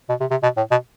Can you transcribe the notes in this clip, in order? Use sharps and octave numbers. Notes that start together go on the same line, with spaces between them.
B2
C3
C3
B2
A2
B2